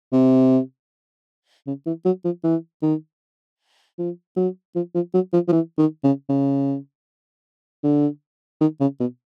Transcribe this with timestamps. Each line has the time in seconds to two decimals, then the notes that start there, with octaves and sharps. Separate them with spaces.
0.12 C3
1.67 C#3
1.86 E3
2.05 F#3
2.24 F3
2.44 E3
2.82 D#3
3.98 F3
4.36 F#3
4.75 F3
4.95 F3
5.14 F#3
5.33 F3
5.48 F3
5.52 E3
5.78 D#3
6.04 C#3
6.29 C#3
7.84 D3
8.61 D#3
8.81 C#3
9.00 B2